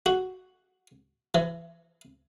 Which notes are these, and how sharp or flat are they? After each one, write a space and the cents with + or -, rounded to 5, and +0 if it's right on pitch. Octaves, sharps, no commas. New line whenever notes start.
F#4 +5
E3 +30